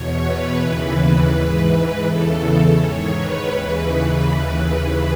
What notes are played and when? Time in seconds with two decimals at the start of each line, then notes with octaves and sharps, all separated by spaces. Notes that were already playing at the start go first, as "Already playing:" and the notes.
Already playing: E2 B2 C#5
0.20 B4
0.56 D#2 C#3 E3 B4
1.30 G#2 E3
1.66 B4
2.02 E2 C#3 E3 A4
2.38 A4
2.74 G#2 D#3 C#5
3.11 B4
3.48 D#2 C#3 E3
4.20 D#2 C#3 E3 B4
4.56 B4